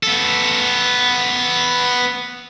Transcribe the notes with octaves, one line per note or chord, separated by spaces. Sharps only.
B3 A4